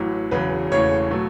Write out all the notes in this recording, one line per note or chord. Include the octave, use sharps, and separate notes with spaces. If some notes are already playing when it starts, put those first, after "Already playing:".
Already playing: A1 A2 F#3
E1 E2 C#3 F#3 B4
E1 E2 C#3 E3 A3 C#5
B2 F#3 A3